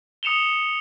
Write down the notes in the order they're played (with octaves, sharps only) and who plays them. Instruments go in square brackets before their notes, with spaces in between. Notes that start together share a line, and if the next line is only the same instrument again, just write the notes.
[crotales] D#6 C#7 E7 F7 G7